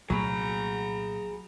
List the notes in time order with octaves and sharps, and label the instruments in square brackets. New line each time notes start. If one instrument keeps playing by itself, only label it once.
[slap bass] C2 A#2 A3 [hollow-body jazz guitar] F#3 [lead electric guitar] G#4 B5 [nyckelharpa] A#5